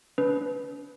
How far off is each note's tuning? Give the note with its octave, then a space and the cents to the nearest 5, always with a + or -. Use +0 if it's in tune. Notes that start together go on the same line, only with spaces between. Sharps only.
D4 -40 B4 +0